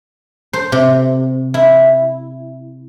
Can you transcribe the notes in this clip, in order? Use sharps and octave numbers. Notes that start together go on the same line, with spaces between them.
C5
C3
E4